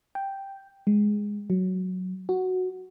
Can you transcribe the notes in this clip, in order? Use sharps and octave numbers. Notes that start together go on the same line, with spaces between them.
G5
G#3
F#3
F#4